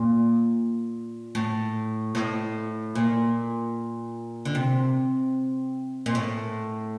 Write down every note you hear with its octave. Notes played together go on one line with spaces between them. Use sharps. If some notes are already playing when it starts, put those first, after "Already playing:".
Already playing: A#2
A2
A2
A#2
D3
C3
A#2
A2